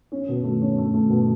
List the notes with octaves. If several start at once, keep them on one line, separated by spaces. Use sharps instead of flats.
C#4
B2
A3
C#4
A3
A3
B2